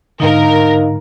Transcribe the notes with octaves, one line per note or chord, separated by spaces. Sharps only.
G#2 D3 D#4 A#4 D#5 F5